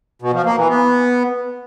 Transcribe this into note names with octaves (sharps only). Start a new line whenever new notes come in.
B2
F3
A#3
E3
B3